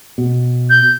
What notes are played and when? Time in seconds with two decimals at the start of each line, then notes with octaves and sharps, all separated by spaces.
0.18 B2
0.70 G6